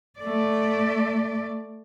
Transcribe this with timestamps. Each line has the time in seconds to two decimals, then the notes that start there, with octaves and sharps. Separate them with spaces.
0.19 A3 D5